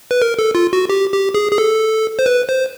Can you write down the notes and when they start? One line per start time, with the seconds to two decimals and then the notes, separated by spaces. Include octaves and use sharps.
0.11 B4
0.22 A#4
0.39 A4
0.55 F4
0.73 F#4
0.90 G4
1.13 G4
1.35 G#4
1.52 G#4
1.58 A4
2.19 C5
2.26 B4
2.49 C5